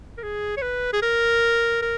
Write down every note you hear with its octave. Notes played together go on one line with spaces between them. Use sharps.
A#4
G#4
C#5
B4
G#4
A#4
A#4